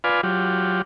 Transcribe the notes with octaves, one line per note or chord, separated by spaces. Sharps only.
F4 B4 D5 F5 G#5
F#3 F4 G4